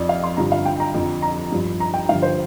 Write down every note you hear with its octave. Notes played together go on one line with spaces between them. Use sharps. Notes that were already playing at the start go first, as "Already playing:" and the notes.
Already playing: F2 F3 D5
F5
C6
G2 D3 F3 A#5
F5
G5
A#5
F2 D3 F3
A#5
G2 F3
A#5
G5
G2 D3 F3 F5
C5